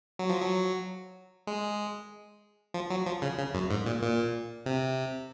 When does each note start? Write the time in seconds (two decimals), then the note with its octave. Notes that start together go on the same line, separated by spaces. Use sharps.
0.19 F#3
0.29 F3
0.40 F#3
1.47 G#3
2.74 F3
2.90 F#3
3.06 F3
3.22 C#3
3.38 C#3
3.54 F#2
3.70 G#2
3.86 A#2
4.02 A#2
4.66 C3